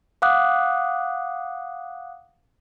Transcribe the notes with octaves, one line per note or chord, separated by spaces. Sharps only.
F5 F#5 D6 D#6 F#6